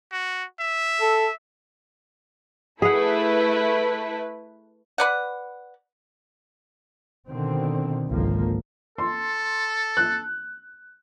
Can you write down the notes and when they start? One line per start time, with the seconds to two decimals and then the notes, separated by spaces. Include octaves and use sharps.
0.12 F#4
0.60 E5
1.01 A4
2.82 A3 E4 G#4 B4 F#5
4.98 B4 D5 F#5
7.28 B2 D3 D#3 C4
8.07 G#1 C#2 D3 F3 A#3
8.98 A4 C6
9.97 F#6